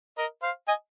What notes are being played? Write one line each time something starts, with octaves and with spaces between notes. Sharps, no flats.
A#4 D#5
C5 F5
D#5 G#5